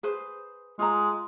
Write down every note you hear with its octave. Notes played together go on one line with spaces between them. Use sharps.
G#4 B4 C5
G#3 F4 A#5